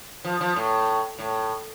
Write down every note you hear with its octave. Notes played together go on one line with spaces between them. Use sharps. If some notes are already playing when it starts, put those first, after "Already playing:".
F3
F3
A2
A2